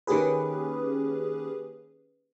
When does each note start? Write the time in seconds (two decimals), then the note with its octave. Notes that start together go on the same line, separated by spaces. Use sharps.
0.07 D#3 A#3 C#4 G4 G#4 B4